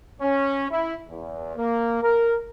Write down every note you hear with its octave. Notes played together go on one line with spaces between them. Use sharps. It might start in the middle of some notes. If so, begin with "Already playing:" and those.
C#4
E4
E2
A#3
A#4